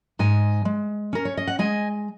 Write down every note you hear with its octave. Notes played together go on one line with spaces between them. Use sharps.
G#2 D#5 G#5
G#3
C#4 A#4
C#5
D#5
F#5
G#3 D#5 G#5